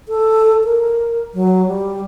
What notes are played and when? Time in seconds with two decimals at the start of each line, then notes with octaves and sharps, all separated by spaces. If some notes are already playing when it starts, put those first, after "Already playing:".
0.08 A4
0.64 A#4
1.34 F#3
1.67 G3